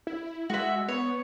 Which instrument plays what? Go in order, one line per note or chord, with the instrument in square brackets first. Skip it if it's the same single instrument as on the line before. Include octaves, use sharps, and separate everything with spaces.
[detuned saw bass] E4
[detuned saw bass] G#3 [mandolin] F#4 E5
[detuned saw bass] B3 [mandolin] C#5